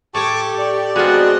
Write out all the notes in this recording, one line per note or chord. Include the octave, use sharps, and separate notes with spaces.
A2 G4 A4 C#5 A5 C#6 D6
D5
G#3 B3 C4 D4 F4 F#4 D#5